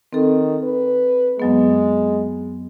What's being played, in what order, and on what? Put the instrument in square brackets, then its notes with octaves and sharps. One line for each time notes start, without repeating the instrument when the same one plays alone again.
[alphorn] D#3 [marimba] C4 A4
[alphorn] B4
[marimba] F#2 F#3 B3 [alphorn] G#3